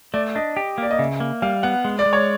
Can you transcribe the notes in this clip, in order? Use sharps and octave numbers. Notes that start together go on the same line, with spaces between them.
A3 D5
D4 D#5
G4
A#3 D5
D#5
C#3 E5
A#3
G3 F5
B3 F#5
G#3
D5
G#3
C#5